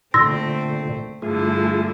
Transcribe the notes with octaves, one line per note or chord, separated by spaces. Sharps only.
A#2 D3 A3 C4 C6 E6 A#6
G2 D3 A3 E4 F4 G#4